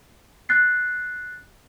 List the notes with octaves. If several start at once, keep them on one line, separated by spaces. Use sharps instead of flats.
F#6 A6 C7